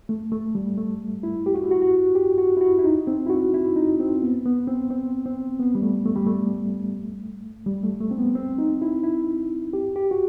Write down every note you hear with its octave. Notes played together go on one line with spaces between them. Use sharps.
A3
A3
G3
A3
E4
G4
F#4
E4
F#4
F#4
G4
F#4
E4
F#4
E4
D#4
C4
E4
F#4
E4
D#4
C4
B3
B3
C4
C4
C4
B3
G3
A3
A3
G3
A3
G3
A3
A3
C4
B3
C4
D#4
E4
E4
G4
G4
F#4